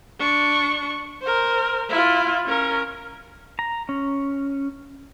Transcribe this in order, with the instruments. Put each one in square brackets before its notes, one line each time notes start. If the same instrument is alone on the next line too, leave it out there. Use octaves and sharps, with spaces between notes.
[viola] D4 C#6
A#4 C5
E4 F4
C#4 A#4
[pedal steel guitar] A#5
C#4